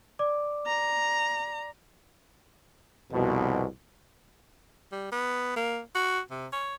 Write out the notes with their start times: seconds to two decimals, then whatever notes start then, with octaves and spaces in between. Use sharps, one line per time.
0.19 D5 D6
0.67 A#5
3.12 C2 F2 B2
4.92 G3
5.12 B3
5.56 A#3
5.95 F#4
6.31 C3
6.52 C#5